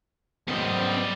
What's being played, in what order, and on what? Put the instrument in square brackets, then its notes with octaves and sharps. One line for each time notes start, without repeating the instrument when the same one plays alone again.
[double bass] G#2 F#3 [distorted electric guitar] G3 D#5 [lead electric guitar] B3 C5